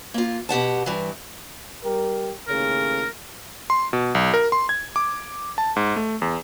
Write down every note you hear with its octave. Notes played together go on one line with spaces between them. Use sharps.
A#3 F4
B2 G4 F#5 A5
G2 E3
G3 G4 A#4
D#2 A2 C#3 A#4
C6
B2
B1
A#4
C6
G#6
D6
A5
G#2
A3
E2